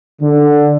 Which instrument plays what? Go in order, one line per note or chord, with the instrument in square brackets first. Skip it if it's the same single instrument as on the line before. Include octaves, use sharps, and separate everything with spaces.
[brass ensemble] D3